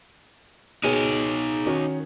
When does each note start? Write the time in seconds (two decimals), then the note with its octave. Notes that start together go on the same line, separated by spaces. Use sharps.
0.84 B2 D#4 G#4 C#5 D#7
1.66 D#3 C#4 F#4